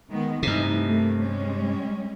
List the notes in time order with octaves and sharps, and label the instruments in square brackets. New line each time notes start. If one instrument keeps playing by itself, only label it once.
[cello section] D#3 G#3 B3
[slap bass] G2 C3 [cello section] E3 A3 D#4
[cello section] A3 A#3
G3 G#3 C#4